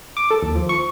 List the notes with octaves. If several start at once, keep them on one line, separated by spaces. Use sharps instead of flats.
D6
A4
D#2
F3
C#6